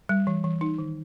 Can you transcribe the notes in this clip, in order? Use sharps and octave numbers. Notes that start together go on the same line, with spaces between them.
G3
E3
E3
D#4
D#3